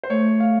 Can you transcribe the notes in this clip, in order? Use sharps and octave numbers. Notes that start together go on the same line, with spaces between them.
C5
A3 C#5
F5